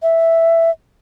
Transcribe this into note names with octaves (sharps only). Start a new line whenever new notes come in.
E5